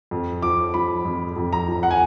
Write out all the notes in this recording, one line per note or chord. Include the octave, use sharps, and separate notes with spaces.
F2
F3 D6
F3 B5
F2
F2
A#5
F3
F#5
G#5